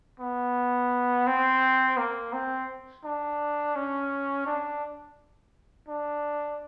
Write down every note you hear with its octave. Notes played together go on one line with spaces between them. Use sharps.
B3
C4
A#3
C4
D4
C#4
D4
D4